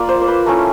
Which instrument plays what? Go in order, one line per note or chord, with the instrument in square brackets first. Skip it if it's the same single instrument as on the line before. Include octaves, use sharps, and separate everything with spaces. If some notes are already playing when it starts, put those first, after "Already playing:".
Already playing: [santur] A#3 F4 D5
C5
C5
B4
A3 C#4 E4 A#4